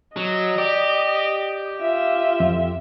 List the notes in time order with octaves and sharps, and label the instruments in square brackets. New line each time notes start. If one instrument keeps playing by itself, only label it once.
[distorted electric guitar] F#3 [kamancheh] D#5
[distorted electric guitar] G4 [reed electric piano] D5
[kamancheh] F4 E5
[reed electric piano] F2